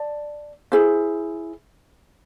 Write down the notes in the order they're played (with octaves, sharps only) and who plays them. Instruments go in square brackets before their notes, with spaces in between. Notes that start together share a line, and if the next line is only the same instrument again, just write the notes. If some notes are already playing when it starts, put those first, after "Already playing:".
Already playing: [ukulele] D5 A5
E4 G#4 C5